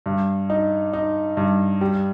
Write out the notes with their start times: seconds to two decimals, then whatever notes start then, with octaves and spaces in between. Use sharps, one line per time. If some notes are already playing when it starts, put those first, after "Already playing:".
0.06 G2
0.50 D#4
0.93 D#4
1.37 G2
1.81 G3